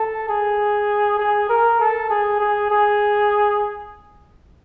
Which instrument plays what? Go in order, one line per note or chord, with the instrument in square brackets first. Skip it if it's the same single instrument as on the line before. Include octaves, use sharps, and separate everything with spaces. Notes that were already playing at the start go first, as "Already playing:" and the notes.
Already playing: [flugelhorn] A4
G#4
G#4
A#4
A4
G#4
G#4
G#4